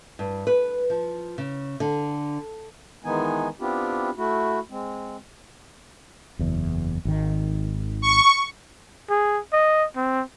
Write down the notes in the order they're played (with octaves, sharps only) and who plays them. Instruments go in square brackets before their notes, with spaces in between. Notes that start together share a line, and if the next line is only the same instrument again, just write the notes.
[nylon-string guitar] G2
B4
F3
C#3
D3
[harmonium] D#3 E3 G#3 B3 D#4 G#5
B3 C4 D4 E4 F4 G4
A3 E4 F#4
G#3 C4
[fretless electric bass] F#1 E2
G#1 D#3
[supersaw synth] C#6
[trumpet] G#4
D#5
C4